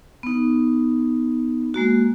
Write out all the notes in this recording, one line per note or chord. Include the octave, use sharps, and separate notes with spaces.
B3 D#4
G#3 A#3 F#4